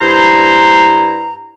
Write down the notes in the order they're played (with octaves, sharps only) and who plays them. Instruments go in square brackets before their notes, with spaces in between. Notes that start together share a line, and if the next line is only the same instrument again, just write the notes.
[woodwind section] G2 E4 C5 A#5